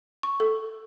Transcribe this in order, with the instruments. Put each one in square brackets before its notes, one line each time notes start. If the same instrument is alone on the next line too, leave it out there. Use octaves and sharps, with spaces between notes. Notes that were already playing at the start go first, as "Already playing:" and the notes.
[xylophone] C#6
A4